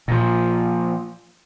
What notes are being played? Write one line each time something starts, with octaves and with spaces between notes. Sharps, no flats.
A#2 F3